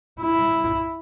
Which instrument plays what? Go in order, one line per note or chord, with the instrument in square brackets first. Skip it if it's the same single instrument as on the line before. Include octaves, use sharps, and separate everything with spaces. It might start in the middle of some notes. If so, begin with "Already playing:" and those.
[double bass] E4